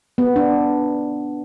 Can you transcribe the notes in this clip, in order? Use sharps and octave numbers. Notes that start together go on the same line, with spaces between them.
B3
D4